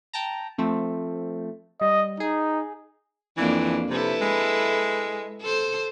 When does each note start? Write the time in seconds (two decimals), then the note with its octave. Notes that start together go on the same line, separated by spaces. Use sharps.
0.13 G5 A5 A#5
0.58 F3 A3 C4
1.81 G3 D#5
2.20 D#4 G#4
3.37 F2 E3 A#3 D4
3.90 C3 E4 A4 B4
4.21 G#3
5.42 A4 C5